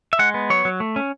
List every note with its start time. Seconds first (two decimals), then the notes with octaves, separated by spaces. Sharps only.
0.13 E5
0.19 G#3 F#5
0.34 B3
0.50 F#3 C#5
0.65 F#3
0.80 A3
0.96 C#4